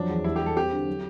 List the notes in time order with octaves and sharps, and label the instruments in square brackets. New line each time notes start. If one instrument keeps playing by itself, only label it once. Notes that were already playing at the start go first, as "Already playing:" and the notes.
Already playing: [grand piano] F2 F#3 [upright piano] D4
[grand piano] E2
[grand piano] G3 [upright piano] E4
[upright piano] G4
[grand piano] G3
[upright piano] A4
[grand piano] C4 [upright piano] G4
[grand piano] D3
F#3